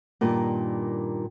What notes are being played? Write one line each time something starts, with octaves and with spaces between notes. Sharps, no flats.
G2 A#2 D#3